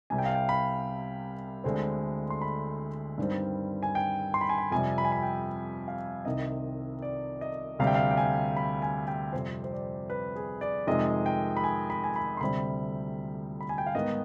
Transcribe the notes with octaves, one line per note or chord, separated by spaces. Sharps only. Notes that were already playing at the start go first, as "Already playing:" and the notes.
C2 C3 G3 G#5
G5
F5
G5
B5
D2 D3 G#3 C4
C6
B5
G2 D#3 G3 C4
G#5
G5
C6
B5
G#5
B5
F2 C3 G3 G#5
B5
G#5
B5
G5
F5
C2 C3 D#3 D#5
D5
D#5
D2 C3 G3 F5
G5
F5
G5
G#5
B5
G#5
G5
F2 C3 G3 C4 C5
C5
D5
B4
G#4
D5
F2 C3 D#3 G#3 D#5
G5
B5
G#5
B5
G#5
B5
C6
D2 C3 G3 C4 B5
B5
G#5
G5
F5
G#2 D#3 B3 D#5